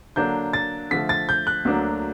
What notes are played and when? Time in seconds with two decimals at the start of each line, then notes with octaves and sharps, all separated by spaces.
0.16 D3 F#3 A#3 D4 G6
0.53 A6
0.91 D3 F3 A3 B6
1.09 A6
1.29 G6
1.47 F#6
1.65 D2 D3 F#3 A#3 D4